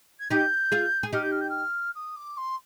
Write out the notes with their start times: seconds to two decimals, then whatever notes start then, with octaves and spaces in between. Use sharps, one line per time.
0.20 G#6
0.31 D#4 G4 G6
0.72 F4 G#4
1.03 G#4
1.13 D#4 G4 F6
1.22 G6
1.31 F6
1.41 G6
1.49 F6
1.95 D#6
2.16 D6
2.37 C6